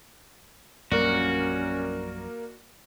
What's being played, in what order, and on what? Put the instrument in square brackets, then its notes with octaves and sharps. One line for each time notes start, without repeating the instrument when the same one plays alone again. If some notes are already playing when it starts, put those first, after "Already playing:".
[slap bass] A#1 F#2 G3 [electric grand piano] A#3 A#4 D5 [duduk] C#4 [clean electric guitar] F#4